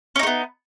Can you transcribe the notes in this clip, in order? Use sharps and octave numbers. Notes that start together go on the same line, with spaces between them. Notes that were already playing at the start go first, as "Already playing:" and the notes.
A3 B3 C#4 D#4